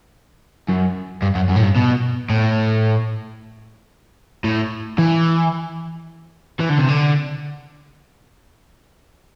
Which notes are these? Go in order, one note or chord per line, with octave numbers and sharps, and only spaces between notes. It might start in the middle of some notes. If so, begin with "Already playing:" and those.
F#2
G2
F#2
F#2
A2
G2
B2
A2
A2
E3
E3
D3
C3
D3